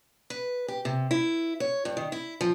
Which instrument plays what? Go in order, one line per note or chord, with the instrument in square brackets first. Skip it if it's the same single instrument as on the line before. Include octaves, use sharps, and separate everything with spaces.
[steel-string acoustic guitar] B4
G4
C3
E4
C#5
G2
D#3
E4
F3